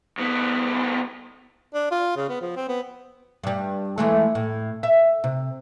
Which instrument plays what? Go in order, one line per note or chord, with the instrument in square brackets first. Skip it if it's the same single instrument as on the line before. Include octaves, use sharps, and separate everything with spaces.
[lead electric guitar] D2 B3
[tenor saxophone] D4
F4
C#3
B3
F3
C4
B3
[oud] G2 G3
E3 G#3 A3
A2
E5
C3